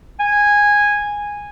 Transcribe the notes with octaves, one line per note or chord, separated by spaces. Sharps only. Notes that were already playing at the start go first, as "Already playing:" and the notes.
G#5